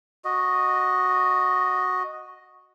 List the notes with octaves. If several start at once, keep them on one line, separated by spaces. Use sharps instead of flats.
F#4 D#5